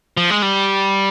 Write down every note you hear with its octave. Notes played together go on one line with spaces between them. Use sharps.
F3
G#3
G3